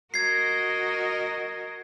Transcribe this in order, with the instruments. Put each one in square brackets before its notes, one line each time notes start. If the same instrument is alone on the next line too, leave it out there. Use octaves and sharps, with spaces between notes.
[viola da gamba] F#4 A#4 D#5 [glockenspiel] G#6 C7